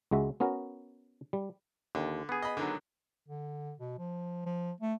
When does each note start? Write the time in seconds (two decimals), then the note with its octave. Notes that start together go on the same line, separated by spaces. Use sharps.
0.11 C#2 G#3 F#4 E5
0.40 B3 C#4 F#4 A#4
1.33 G3
1.95 D#2 D3
2.29 B3 G#4
2.42 D#5 B5
2.57 D3 D#3 F#3
3.28 D3
3.79 B2
3.98 F3
4.46 F3
4.81 A3